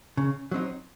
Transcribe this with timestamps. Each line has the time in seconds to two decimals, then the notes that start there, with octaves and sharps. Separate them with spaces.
0.17 C#3
0.51 F#3 C4 D#4